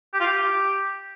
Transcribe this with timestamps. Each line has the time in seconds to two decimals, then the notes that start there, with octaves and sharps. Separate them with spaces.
0.14 G4
0.20 F4
0.27 G4